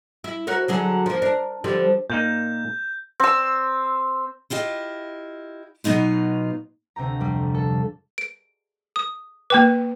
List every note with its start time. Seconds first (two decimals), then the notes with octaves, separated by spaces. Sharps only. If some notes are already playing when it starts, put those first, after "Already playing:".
0.24 E4
0.47 F#4 A#4 C#5
0.68 D3 F#3 G#4
1.06 F3 A#3
1.22 D4 A#4
1.64 D3 F3 G3
2.10 A#2 A#3 D#4 G6
3.20 C4 E6
4.50 E4 F4 G4 D#5
5.84 B2 F#3 B3 D#4 F4
6.96 D2 C3 G4 A#5
7.20 F2 G3
7.55 A4
8.18 D7
8.96 D#6
9.50 A#3 B4 G5 D6